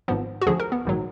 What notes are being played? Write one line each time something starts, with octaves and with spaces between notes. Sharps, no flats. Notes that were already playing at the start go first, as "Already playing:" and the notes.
G#1 G#2 F3 B3
F#4
D2 D3 F3 G#4
A#4
B3
A#1 G#2 D#3 F#3